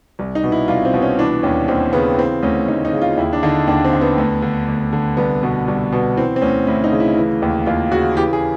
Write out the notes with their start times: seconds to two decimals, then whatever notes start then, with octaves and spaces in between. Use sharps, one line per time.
0.19 C2
0.35 D#4
0.44 B2
0.52 E4
0.68 C2 F4
0.85 C4
0.94 B2
1.02 C#4
1.19 E3 D4
1.43 D#2 C#4
1.68 D#2 C4
1.93 C#3 B3
2.18 E3 C4
2.43 D2 C#4
2.68 D2 D#4
2.85 D#4
2.93 C#3
3.02 F4
3.17 D#2 E4
3.33 D4
3.43 D3 D#4
3.67 D#2 D4
3.85 C4
3.93 D3
4.01 B3
4.18 D2
4.42 D3
4.68 D2
4.93 D3
5.17 C2 B3
5.43 B2
5.68 C2
5.92 B2
6.17 E3 C4
6.36 C4
6.42 D2 C#4
6.67 D2 E4
6.84 D#4
6.92 C#3
7.00 E4
7.17 E3
7.42 D#2
7.66 D#2 F4
7.92 C#3 F#4
8.17 E3 G4
8.33 G#4